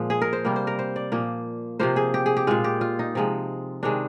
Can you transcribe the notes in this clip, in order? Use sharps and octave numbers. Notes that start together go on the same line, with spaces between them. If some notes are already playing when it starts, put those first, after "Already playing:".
Already playing: A#2 F3 G#3
G#4
A#4
C5
C3 G3 A#3
C5
A#4
C5
D5
A#2 F3 A#3
C3 F3 A#3 C5
G#4
G4
G#4
G4
A#2 G#3 F4
G4
F4
D#4
C3 F3 G#3
C3 D#3 G#3 D4